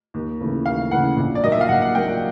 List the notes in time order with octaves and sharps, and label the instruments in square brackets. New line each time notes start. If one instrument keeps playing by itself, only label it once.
[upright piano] D#2
C#3 E3 A3 C#4
[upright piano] D#2 [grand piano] F5
[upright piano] C#3 E3 A3 C#4 [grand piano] F#5
[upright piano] A#1
[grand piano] D5
[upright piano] A#2 F#3 A#3 D#4 [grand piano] D#5
[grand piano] E5
F5
[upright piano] A#1 [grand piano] F#5
[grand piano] F#5
[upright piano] A#2 F#3 A#3 D#4 [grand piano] G5